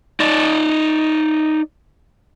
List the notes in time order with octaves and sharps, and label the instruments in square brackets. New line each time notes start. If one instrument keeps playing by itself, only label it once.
[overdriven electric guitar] D#4 D5